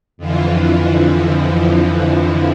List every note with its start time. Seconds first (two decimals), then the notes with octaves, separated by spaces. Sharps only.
0.17 F2 D3 E3 F3